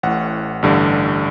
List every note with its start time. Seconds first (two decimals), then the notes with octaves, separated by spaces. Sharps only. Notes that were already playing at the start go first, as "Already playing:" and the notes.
0.03 A1 A2 F#5
0.62 A1 G2 D3